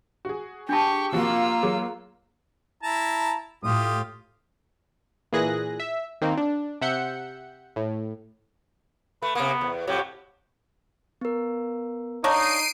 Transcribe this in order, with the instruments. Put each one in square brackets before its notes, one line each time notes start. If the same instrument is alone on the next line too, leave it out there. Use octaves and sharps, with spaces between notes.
[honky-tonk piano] F#4 G#4
[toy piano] D4 A5 [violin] G4 C#6
[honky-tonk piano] C3 F3 F#4 [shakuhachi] A#3 [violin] F4 E6
[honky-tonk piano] F#3 [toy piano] G#4
[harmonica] E4 A5 A#5
[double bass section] A2 [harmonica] F4 G4 D#6
[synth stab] A#2 E3 G#4 F#6 A#6
E5
D#3 A#3 C4 D#4
D4
C3 E5 F#5 G6 C#7
A2
[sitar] A3 [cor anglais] B4
[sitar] C3 A#3 [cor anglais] B3
[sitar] E2
[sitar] F2 A2 F#3 [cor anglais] G4
[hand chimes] B3 A#4
[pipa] A#3 D4 C#5 [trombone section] D#4 [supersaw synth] C7 D7 D#7